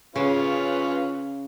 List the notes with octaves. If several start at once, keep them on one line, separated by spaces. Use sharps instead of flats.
C#3 C#4 F4 B4